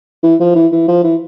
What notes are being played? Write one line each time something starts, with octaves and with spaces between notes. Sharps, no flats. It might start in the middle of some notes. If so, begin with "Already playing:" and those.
E3
F3
E3
E3
F3
E3